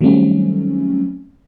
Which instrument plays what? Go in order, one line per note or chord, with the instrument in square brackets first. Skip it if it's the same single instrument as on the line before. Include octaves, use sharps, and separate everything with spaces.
[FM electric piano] D#3 F#3 G3 A3 C4 C#4